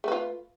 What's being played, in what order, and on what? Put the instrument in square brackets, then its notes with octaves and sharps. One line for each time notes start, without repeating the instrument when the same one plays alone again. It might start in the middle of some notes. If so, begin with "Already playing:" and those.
[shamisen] A3
B4
F4